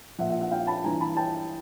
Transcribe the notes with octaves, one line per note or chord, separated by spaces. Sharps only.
A#2 F3 E5 F#5
E5 F#5
E5 F#5
F5 G5
A5 B5
G2 E3 G#5 A#5
A5 B5
G5 A5